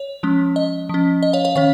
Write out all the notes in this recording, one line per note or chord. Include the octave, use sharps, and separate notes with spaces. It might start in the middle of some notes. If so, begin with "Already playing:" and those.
Already playing: C#5
F3 G#3 C#4
D#5
F3 C#4
D#5
C#5 F5
C#5 F5
D#3 C#4 C#5 F5